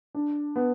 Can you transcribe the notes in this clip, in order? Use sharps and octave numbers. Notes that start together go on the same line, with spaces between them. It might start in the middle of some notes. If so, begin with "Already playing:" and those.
D4
B3